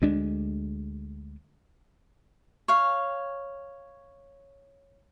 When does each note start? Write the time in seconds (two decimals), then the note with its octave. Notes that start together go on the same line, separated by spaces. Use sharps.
0.02 D2 G#3 D4
2.68 C#5 F5